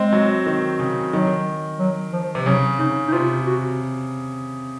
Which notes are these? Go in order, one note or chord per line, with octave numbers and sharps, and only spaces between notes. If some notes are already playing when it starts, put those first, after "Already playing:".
Already playing: G#3 C4
F#3
D#3
C#3
D#3 F#3
F#3
F3
C3
C#3 F#3
C#3 D#4
D#4
C3 F4
F#4